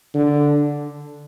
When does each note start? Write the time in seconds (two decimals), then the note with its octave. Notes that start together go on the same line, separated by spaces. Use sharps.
0.14 D3